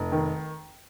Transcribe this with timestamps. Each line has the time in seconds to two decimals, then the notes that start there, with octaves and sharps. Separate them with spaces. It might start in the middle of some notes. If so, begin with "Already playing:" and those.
Already playing: F1
0.12 D#3